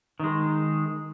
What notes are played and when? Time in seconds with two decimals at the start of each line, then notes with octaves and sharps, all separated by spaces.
0.20 D#3 G#3